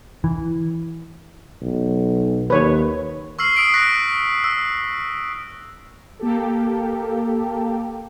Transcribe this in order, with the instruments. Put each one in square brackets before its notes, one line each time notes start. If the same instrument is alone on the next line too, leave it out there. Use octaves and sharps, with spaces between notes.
[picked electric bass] E3
[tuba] B1
[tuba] D#2 [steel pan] B4 C#5
[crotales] C#6 E6 F6 C7 F#7
D#6 E6 B6 C7 D7
C#6 F#6 A#6 B6
E6
[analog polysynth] A#3 G4 A4